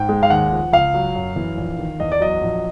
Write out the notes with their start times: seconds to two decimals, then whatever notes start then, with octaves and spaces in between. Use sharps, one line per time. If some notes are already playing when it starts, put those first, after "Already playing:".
Already playing: G#2 G5
0.09 G#3
0.23 F5
0.30 D#2 F#5
0.51 F3
0.72 C#2 F5
0.94 F#3
1.15 F#2
1.36 E3
1.57 A#1
1.79 D#3
2.00 E2 D#5
2.12 D5
2.21 F#3 D#5
2.42 A#1